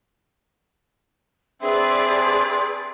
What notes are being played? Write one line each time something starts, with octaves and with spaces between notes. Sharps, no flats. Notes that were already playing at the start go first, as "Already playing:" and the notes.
C4 D4 G#4 B4 D5 E5 C6